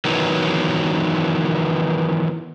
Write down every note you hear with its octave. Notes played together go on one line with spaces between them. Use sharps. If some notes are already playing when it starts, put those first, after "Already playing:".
D#3 E3 F#3 B3